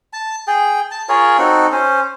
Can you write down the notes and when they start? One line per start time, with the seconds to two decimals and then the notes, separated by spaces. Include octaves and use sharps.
0.13 A5
0.47 G#4 G5
0.91 A5
1.09 F4 G#4 A#4 C#5
1.38 C4 D#4 F#4 A4
1.72 C#4 C5